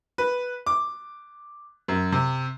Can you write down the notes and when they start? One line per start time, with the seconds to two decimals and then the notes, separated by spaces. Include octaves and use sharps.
0.18 B4
0.66 D6
1.88 F#2
2.12 C3